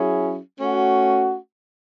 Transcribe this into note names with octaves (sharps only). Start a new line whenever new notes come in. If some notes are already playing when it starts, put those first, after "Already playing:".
Already playing: F#3 C#4 E4 G#4
A3 C#4 F#4